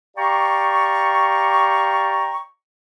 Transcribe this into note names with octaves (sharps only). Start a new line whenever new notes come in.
G4 D5 F5 G5 A#5 C#6